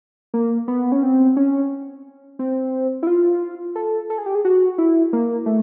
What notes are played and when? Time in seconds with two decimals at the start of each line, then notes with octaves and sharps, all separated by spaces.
0.34 A#3
0.68 B3
0.92 C#4
1.03 C4
1.37 C#4
2.39 C4
3.03 E4
3.07 F4
3.75 A4
4.10 A4
4.18 G#4
4.26 G4
4.35 G#4
4.45 F#4
4.78 E4
5.13 A#3
5.46 A3